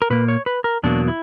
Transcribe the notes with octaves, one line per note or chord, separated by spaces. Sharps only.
A#4
A#2 A#3 B4
C#5
B4
A#4
E2 B2 F#3 A#3 D4
E4